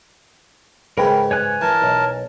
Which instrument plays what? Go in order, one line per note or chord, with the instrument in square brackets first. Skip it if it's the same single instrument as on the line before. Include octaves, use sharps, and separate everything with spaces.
[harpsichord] G#2 C#3 [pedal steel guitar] A#4 [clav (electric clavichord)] B4 G5
[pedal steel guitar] C#5 G#5 F#6
[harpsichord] E3 [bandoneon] A#4 A5
[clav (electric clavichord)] B1